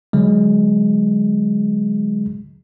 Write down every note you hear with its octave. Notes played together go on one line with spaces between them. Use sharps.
D3 F#3 G#3